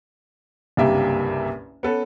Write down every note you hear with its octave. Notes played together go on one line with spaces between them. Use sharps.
F#1 C2 G2 A#3 G4 E5
B3 C#4 A4 B4